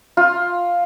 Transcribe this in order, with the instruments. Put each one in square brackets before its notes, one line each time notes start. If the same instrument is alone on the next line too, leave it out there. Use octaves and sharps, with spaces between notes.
[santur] F4